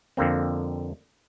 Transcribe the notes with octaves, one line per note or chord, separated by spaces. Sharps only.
F2 D3 A#3 C4